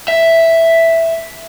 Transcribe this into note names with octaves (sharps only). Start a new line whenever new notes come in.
E5